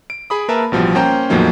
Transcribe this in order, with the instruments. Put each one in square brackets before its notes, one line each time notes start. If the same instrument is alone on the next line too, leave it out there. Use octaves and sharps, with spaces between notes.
[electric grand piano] D7
G#4 B5 D#6
A#3 A#4 B4 E5 A5
A1 B2 F3 G3
A#3 C#4 C5 G5 A#5 C6
E2 A2 F3 F#3 A#3 D#4